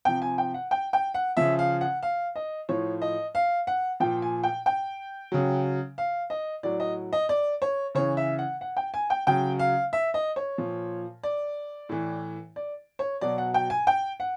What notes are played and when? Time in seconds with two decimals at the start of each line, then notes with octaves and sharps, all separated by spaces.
0.05 C3 F3 G5
0.22 G#5
0.38 G5
0.54 F#5
0.71 G5
0.93 G5
1.14 F#5
1.37 C#3 F3 E5
1.59 F5
1.81 F#5
2.03 F5
2.36 D#5
2.69 A2 F3 C#5
3.02 D#5
3.35 F5
3.67 F#5
4.00 A#2 F3 G5
4.22 G#5
4.44 G5
4.66 G5
5.32 C#3 F#3
5.98 F5
6.30 D#5
6.63 A2 F#3 D5
6.80 D#5
7.13 D#5
7.29 D5
7.62 C#5
7.95 C#3 E3 C#5
8.17 E5
8.39 F#5
8.61 F#5
8.77 G5
8.94 G#5
9.10 G5
9.27 C#3 F#3 G5
9.59 F5
9.93 E5
10.14 D#5
10.36 C#5
10.58 A#2 F3
11.23 D5
11.89 A2 E3
12.56 D5
12.99 C#5
13.21 B2 F#3 D5
13.38 F#5
13.54 G5
13.70 G#5
13.87 G5
14.20 F#5